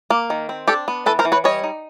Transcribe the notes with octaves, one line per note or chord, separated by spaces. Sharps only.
A#3
D#3
C4
D4 G4 A4
B3
E3 A4 B4
A#4 C5
E3
B4 C#5
G3 C#5 D#5
D#4